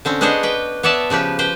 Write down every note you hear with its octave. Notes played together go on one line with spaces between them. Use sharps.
D3 C4 C#4
B3 D4 G#4 C5 C#5 D#5
B4 G5
B3 C#5 D5 E5 A5
C#3 F3 G4 B4
B4 C5 G5